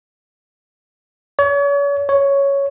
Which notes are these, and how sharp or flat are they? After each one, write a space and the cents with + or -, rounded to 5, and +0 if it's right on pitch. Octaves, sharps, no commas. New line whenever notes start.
C#5 +40
C#5 +5